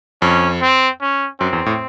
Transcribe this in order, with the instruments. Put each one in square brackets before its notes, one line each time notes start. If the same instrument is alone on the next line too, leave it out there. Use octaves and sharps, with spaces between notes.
[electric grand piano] F2 [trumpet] C#4
[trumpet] C4
C#4
[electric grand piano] F#2 [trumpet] C4
[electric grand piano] E2
A2